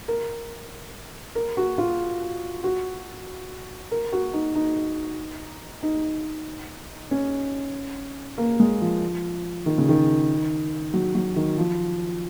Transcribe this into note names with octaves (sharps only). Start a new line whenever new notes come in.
A#4
A#4
F#4
F4
F#4
A#4
F#4
D#4
D#4
D#4
C#4
A#3
G#3
F3
D#3
C#3
D#3
F#3
F#3
D#3
F3